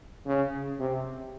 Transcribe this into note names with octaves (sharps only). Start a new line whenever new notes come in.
C#3
C3